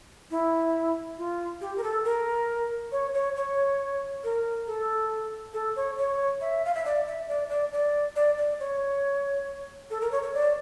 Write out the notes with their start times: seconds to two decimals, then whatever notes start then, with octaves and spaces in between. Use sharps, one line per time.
0.31 E4
1.18 F4
1.61 G4
1.77 A#4
1.83 A4
2.05 A#4
2.92 C#5
3.14 C#5
3.36 C#5
4.24 A#4
4.67 A4
5.54 A4
5.76 C#5
5.98 C#5
6.41 E5
6.65 F5
6.75 E5
6.85 D5
7.07 E5
7.29 D5
7.50 D5
7.73 D5
8.16 D5
8.38 D5
8.60 C#5
9.90 A4
10.01 A#4
10.12 C#5
10.23 C#5
10.34 D5